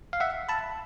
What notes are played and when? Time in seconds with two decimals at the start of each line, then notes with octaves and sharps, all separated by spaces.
0.13 F5
0.20 E5 F#5
0.49 A5 B5